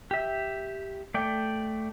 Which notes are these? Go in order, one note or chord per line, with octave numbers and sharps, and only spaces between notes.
G4 E5
A3 D5 G5